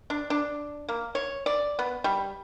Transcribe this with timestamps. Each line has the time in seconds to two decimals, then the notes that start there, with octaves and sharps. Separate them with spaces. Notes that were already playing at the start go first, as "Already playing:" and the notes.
0.10 D4
0.30 D4
0.89 A#3
1.15 C#5
1.46 D5
1.79 B3
2.04 G3